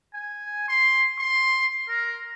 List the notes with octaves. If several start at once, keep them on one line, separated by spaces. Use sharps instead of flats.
G#5
C6
C6
A#4